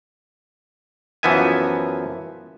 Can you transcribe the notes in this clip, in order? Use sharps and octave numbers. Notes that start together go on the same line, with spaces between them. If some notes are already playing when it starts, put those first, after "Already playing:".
F#2 E3 F3 B3 E5 G#5